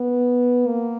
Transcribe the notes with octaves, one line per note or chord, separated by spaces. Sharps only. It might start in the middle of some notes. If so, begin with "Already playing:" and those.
Already playing: B3
A#3